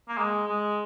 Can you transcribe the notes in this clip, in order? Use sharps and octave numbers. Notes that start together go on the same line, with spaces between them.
A#3
G#3
G#3